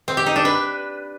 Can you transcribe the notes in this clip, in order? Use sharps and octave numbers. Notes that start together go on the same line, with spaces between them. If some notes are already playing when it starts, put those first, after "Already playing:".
C4
G4
D#4
D4
B4